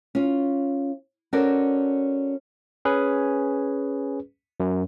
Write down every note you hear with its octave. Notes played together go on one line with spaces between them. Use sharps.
C#4 F4
C#4 F#4 A4 A#4 C5 D5
C#4 G#4 B4
F#2